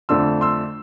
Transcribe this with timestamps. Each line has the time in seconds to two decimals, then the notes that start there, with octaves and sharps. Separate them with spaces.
0.09 F2 D3 A3 D4 C6 E6
0.41 C6 E6